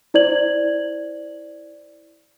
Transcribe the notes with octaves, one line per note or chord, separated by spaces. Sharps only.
E4 C5 D5 G#6 F#7